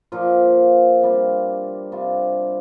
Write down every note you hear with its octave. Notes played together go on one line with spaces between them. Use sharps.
A#2 F3 A#3 F4
C3 G3 D4 F4
C3 G3 D4 F4